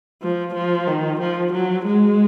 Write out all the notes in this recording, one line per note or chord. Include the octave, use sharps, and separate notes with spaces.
F3
F3
D#3
F3
F#3
G#3